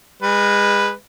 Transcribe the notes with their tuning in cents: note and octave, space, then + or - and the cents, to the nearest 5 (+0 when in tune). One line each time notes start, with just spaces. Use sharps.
G#3 -30 B4 +0